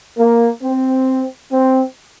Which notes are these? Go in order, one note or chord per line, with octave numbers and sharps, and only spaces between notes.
A#3
C4
C4